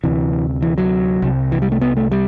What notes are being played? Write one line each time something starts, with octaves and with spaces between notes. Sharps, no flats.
D2 C3 E3
E3
F#3
C2 C3
E3
G3
A3
B3
A3
G3